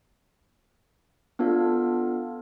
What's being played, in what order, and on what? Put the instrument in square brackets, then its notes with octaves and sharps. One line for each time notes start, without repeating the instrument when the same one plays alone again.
[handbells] B3 D4 F4 A4 F5